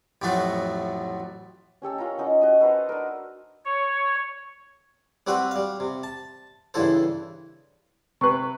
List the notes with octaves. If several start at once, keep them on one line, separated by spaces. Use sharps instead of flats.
A1 F2 F#3 A3 F#4
C#4 G4 A4 E6
C#4 F4 A#4 A#5
C#4 D#4 F#4
F#4 D#5
A4 B4 C5 A#5
D4 A#4
C#5
G3 C4 F#4 B4 C5 E5
G3 F5
C3
A5
G2 C#3 E3 E4 A4 C5
C3 B4 C#6